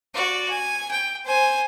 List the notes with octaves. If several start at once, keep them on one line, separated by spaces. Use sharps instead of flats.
F#4 D5
G#5
G5
C5 G#5